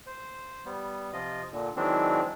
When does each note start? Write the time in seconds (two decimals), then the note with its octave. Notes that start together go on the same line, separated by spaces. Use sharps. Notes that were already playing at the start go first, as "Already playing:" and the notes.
0.07 C5
0.65 G3 B3
1.13 C3 F3 F4 D#5
1.52 A#2 D3
1.76 D#3 E3 F#3 G#3 C4 D4